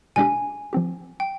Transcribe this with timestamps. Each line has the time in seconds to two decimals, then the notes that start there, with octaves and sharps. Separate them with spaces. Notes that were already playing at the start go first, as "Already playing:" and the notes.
0.16 B2 G#3 D4 G4 G#5
0.73 F3 C4 G4
1.20 G5